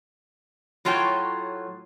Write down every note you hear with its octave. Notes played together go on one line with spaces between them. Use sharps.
A2 F#3 F4 F#4 C#5 G5